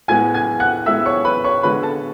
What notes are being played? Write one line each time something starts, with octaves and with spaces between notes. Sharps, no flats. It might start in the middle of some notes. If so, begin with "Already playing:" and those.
A2 G#3 B3 G#5 G#6
G#5 G#6
F#5 F#6
A2 G#3 B3 E5 E6
C#5 C#6
B4 B5
C#5 C#6
D3 G#3 B3 B4 B5
A4 A5